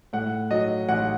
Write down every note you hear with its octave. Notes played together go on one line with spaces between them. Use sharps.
A2 F#5
F#3 D#5
A1 F#5